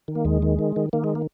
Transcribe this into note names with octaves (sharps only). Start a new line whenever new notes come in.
D#3
A#3
D#2 G#3
D#3
D#3
D#3
D#3 A#3
G#3
A#3